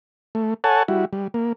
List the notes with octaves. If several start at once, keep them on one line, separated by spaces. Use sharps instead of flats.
A3
A4 C#5 F#5 G#5 A5
G3 E4 F#4
G3
A#3